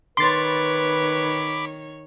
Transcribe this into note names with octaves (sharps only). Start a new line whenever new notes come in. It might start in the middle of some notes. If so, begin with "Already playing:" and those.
D#3 B4 C#5 B5 C6 D6 A6